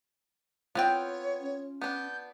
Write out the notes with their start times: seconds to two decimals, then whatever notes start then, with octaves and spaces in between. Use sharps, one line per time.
0.75 B3 C4 F4 C#5 G5
1.41 C#4
1.82 B3 D4 G6